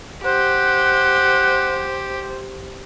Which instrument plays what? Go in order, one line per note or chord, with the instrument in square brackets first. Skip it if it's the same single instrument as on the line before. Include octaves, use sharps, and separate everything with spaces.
[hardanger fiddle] G4 [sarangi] C5 [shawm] F#5